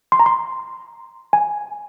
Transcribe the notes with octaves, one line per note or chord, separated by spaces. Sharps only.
C6
A#5
C6
G#5